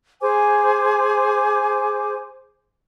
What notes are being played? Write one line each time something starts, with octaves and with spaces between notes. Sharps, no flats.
G#4 C5 G#5 D6